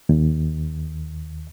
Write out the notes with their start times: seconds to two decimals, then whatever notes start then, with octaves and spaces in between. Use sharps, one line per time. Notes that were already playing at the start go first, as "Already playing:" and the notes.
0.09 D#2